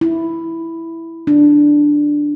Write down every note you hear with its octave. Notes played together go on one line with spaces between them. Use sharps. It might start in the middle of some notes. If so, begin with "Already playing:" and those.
E4
D4